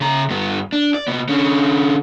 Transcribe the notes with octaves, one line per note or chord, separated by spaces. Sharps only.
C#3 A#5
G2 B3
D4
D5
C3 B3
D3 C#4